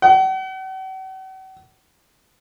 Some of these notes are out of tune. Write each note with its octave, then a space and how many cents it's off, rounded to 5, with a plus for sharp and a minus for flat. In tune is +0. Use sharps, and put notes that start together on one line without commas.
F#5 +45